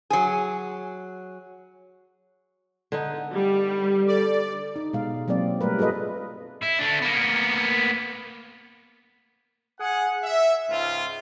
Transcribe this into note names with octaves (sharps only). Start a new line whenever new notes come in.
F#3 G#4
D3 B3 D#4
G3
A4 D5
D#4
B2 G#3 F5
F#3 A#3 C4 D5
G3 A3 A#4 B4
F4 G#4 A4 B4 D#5
E4
A3 D4
A#3 B3
G#4 F#5
E5
C#2 G#2 F4